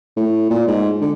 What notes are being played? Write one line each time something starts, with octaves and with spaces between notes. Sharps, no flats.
A2
A#2
G#2
D3